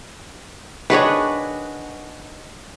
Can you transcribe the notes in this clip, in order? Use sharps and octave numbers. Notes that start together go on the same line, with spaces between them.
D#3 D4 F#4 G#4 B4 C#5